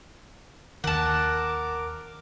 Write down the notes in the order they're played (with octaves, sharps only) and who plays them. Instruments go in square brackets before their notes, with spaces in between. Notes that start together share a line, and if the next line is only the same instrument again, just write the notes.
[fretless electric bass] D#2 D#3 [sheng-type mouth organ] A#4 D6 [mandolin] F#5 A5